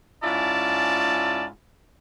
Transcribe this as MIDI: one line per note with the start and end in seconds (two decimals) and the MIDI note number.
0.23 1.46 44
0.23 1.46 61
0.23 1.46 64
0.23 1.46 65
0.23 1.46 74
0.23 1.46 81